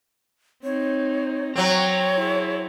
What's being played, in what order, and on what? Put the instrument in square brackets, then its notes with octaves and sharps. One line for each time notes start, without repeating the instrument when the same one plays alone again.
[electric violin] C4 D#4 [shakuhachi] C#5
[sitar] F#3 C4 [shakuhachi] C#5 [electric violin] A#5
[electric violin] E4 G#4